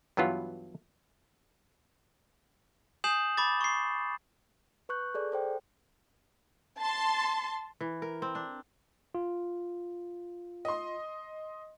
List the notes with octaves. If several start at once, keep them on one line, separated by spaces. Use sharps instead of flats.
G2 E3 F#3 B3 F4
G#5 D#6 G6 C7 E7 F#7
B5 D6 A6
C#6 C7
B4 C#6 F#6 G6
G#4 A4 D5
A4 C5 G5
A5 C6
E3
A#4
C4
D4
F4
D#5 C6